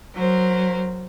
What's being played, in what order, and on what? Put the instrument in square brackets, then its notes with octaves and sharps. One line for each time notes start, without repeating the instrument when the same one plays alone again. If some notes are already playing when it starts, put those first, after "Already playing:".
[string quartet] F#3 A#4 C5